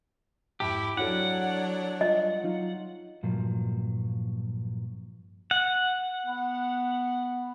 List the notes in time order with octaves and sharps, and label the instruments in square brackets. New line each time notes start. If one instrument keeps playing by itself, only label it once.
[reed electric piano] F2 G#2 A5 [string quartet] E4 [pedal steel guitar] G4
[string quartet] F#3 D4 C#5 [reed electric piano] E4 F#4 A4 [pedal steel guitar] F#5
[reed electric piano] G3 F4 [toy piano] D#5
[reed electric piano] F#3 D#4 F4
[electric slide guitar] G2 A#2 F3 F#3
[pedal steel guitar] F#5
[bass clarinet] B3